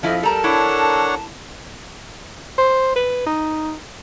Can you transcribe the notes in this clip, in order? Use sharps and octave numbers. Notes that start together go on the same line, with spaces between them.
F2 F3 E4 D#5 F5
G3 A4 A#4 A5 A#5
D4 E4 C#5 F#5
C5
B4
D#4